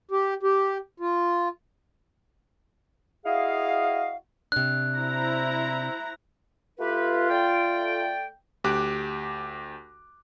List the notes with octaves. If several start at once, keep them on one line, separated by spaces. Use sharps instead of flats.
G4
G4
F4
E4 F#4 G#4 D#5 F5
C3 D4 F#6
E4 C5 A#5
A3 F4 G4 B4
A3 D5 G5
D2 G4 D6 F#6